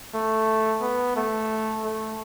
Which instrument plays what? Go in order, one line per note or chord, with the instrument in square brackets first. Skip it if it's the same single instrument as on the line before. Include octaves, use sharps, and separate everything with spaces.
[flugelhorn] A3
B3
A3
A3